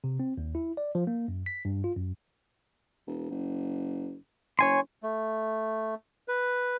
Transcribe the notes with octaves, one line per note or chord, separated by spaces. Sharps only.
C3
C4
D#2
E4
D5
F3
A#3
F#2
B6
G2
F4
F#2
E1
F#1
F#1 C#5 G#5 C6
A3
B4